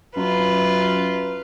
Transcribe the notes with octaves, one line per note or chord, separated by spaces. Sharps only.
F#2 F4 B4